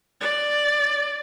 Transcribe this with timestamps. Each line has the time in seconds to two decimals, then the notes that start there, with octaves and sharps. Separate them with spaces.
0.20 D5